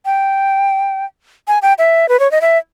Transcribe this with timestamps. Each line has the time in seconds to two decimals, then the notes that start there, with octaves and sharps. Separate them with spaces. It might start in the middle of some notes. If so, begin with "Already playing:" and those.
0.05 G5
1.48 G#5
1.62 G5
1.78 E5
2.09 B4
2.20 C#5
2.32 D#5
2.41 E5